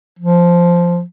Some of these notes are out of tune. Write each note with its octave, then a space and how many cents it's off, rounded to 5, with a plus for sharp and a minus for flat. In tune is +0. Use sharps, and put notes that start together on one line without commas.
F3 -5